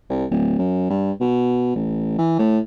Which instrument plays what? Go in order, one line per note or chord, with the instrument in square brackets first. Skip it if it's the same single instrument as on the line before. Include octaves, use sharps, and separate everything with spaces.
[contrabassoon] C2
D1
F#2
G2
B2
A1
E3
A2